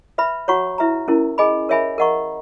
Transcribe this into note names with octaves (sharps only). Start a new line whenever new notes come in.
B4 E5 B5
F#4 C#5 F#5 A#5 C#6
E4 B4 E5 A#5
C#4 E4 A#4
G#4 D#5 G#5 B5
A#4 C#5 E5 G#5 B5
A#4 D#5 F#5 A#5 C#6